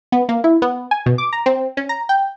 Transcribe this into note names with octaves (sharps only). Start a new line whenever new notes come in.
B3
A#3
E4
B3
G#5
B2
D6
A#5
C4
C#4
A#5
G5